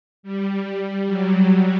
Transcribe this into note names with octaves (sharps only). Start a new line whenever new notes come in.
G3
F#3